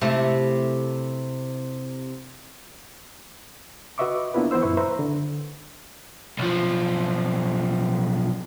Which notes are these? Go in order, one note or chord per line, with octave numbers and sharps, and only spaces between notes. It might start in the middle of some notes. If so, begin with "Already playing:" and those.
C3 A3 E4
F#4 B4 D#5 E5 C#6 D6
A#3 B3 D4 E4 F4 B4
E3 B3 E4 C5 E6
F#2 A#2 E4 B4 C#6
B4 C5 E5 A#5
D3
B1 F3